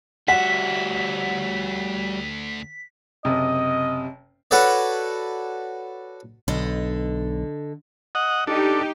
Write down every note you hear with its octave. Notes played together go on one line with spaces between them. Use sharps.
D2 G3 F#4 E5 F#5 B6
F#1 C3 D#5
F#4 A4 B4 C#5 D5
B1 D3 A4 D#5
D#5 F#5
D4 D#4 G4 A4